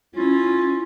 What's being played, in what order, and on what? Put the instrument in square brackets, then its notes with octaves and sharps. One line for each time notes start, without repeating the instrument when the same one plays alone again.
[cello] C#4 [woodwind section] E4 F4